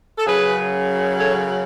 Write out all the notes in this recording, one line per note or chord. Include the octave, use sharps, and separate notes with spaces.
A4
F#2 C#3 F#3 G#4 B4
A4 C#5